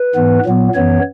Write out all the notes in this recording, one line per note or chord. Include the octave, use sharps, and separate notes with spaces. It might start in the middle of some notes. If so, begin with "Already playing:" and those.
Already playing: B4
G#2 E3 B3
A#2 F#3 B3
F#2 E3 B3 C#5